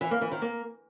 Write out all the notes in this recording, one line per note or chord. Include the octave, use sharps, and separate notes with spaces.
E3
A#3
E3
D#3
A#3